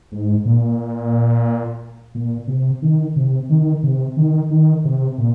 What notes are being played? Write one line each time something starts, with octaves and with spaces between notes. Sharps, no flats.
G#2
A#2
A#2
C3
D#3
C3
D#3
C3
D#3
D#3
C3
A#2